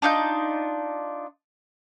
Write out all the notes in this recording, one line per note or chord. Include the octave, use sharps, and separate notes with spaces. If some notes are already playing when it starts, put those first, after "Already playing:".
D4 D#4 F4 G6